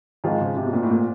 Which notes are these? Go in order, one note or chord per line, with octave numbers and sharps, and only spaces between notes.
G#2 D#3 F3 G#3 C4 F4
C#3
C3
B2
A#2
A2
A#2